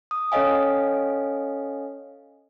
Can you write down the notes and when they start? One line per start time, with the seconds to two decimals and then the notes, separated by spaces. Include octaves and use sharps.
0.11 D#6
0.32 C#4 A4 C#5 D#5 F5 G#5